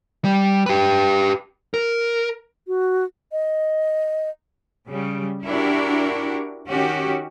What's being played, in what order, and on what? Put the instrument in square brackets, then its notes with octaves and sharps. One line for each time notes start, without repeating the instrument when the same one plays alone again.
[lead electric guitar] G3
G4 B4
A#4
[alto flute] F#4
[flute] D#5
[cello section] C#3 G3
D4 E4 F#4 G4 A#4
D#3 C#4 F#4 G4